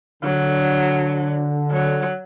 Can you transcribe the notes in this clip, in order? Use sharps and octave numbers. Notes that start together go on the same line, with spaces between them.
D3 F#3
F#3